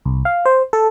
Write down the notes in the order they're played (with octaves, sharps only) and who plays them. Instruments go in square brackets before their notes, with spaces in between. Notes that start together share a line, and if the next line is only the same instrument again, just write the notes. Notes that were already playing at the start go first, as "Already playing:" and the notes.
[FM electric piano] C2
F5
C5
A4